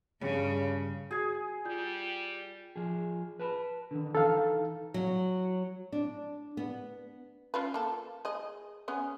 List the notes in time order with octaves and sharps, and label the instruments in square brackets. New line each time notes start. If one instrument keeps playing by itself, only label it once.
[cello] G2 C#3
[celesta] F#4 G#6 [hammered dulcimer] G#4
[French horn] G3 [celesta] F4 G6
[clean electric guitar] F3 G#4
B4 A5 B5
D3 D#3
[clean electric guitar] E3 D#4 [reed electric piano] A4 F5
[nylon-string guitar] F#3
D4
B3
[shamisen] C#4 F4 B4
A#3 A4
G#4 D#5
B3 C#4 G#4